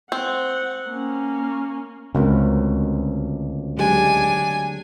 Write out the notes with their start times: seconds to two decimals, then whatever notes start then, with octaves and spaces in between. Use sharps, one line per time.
0.12 C4 F#5
0.89 A#3 C#4
2.15 C#2 D3 A3 C4 F#4 A#4
3.78 F#3 G#3 D4 G4 G#5